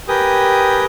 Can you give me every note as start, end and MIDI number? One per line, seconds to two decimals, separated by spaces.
0.08 0.85 67
0.08 0.85 70
0.08 0.85 71
0.08 0.85 79
0.08 0.85 80
0.08 0.85 87